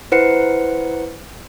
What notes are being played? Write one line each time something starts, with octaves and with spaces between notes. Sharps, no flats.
E4 B4 C5 F#5 C#7